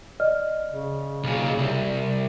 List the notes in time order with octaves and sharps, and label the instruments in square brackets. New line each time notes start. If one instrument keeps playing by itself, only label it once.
[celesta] D5 D#5 F6
[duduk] C#3
[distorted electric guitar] B1 A#2
C2